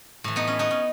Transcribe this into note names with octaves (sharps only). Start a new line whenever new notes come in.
A2 E3
B3 D#4
C#4
B3 D#4
C#4